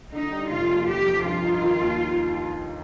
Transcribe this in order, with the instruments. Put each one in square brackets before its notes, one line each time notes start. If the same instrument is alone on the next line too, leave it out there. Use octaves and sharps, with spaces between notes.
[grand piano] D3 [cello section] D#4
[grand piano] G3
[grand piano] F1 [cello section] F4
[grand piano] D#2
[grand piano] F3 [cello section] G4
[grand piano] F3
[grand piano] G2 [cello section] F4
[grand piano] D#4
D#3
D#2